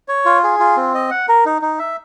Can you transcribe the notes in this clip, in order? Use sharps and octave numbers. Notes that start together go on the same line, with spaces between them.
C#5
F4
G#4
F4
C4
D#5
F#5
A#4
D#4
D#4
E5